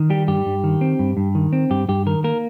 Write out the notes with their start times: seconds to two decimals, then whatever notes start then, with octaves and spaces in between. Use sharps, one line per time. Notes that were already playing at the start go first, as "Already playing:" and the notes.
Already playing: D#3
0.10 G3 G4
0.28 G2 G4
0.46 G2
0.64 D#3
0.81 C4
0.99 G2
1.17 G2
1.35 D#3
1.53 C4
1.70 G2 G4
1.88 G2 G4
2.06 D#3 A#4
2.24 A#3 A#4